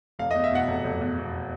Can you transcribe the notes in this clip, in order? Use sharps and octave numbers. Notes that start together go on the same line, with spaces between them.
F1 F5
E2 D#5
E5
B2 F#5
F1
F1
E2
B2